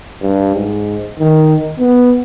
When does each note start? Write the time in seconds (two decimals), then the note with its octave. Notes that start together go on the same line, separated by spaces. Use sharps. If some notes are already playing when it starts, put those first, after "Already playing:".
0.22 G2
0.55 G#2
1.19 D#3
1.80 B3